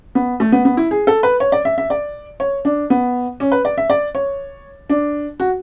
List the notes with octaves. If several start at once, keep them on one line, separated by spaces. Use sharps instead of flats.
B3
A3
B3
B3
E4
G#4
A4
B4
C#5
D5
E5
E5
D5
C#5
D4
B3
C#4
B4
D5
E5
D5
C#5
D4
F#4